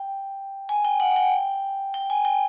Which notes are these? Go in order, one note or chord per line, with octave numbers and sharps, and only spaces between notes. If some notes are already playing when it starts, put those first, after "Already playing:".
Already playing: G5
G#5
G5
F#5
F#5
G5
G5
G#5
G5